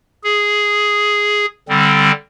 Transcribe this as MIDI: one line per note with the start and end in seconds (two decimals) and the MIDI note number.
0.23 1.45 68
1.69 2.11 50
1.69 2.11 55
1.69 2.11 60